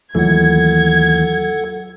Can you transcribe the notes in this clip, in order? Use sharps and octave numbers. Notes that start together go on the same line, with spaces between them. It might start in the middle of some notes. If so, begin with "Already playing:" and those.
D#2 E3 F#3 A3 F4 A4 F#5 G#6